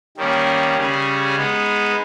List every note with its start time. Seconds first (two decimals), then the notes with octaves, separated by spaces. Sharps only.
0.18 D#3 G3 A#3 C#4
0.77 C#3 G3 C#4 G#4
1.36 G#3 B3 D#4